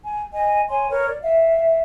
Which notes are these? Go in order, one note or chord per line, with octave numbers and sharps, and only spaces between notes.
G#5
D#5 G#5
C#5 G#5 C6
A#4 B4 C#5
D5
E5 F5